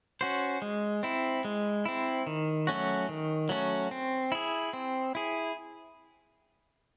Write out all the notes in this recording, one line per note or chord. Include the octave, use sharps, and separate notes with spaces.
C#4 F#4 C5
G#3
C4 E4
G#3
C4 E4
D#3
F#3 A3 C#4 F#4
D#3
F#3 A3 C#4 F#4
C4
E4 G#4
C4
E4 G#4